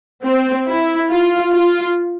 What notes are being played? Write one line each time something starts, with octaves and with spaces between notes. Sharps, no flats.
C4
E4
F4
F4